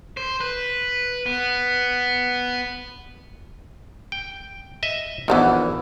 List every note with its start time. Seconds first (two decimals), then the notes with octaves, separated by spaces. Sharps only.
0.17 C5
0.41 B4
1.26 B3
4.12 G5
4.83 D#5 E5
5.28 A#1 D#3 E3 A#3 B3